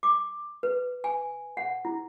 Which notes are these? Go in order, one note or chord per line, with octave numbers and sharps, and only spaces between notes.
D6
B4
G#5
F#5
E4